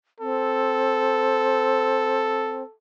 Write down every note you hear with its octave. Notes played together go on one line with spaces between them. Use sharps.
C4 A4